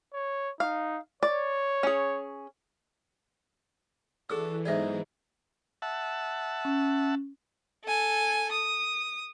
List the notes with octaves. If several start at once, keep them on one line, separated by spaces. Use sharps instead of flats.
C#5
D#4 F5
C#5 D5
C#4 G#4
E3 D4 F#4 G#4 A4 E6
B1 G#2 D#4 E4 G#4 D5 E5
E5 F#5 A5
C#4
A4 G#5
D#6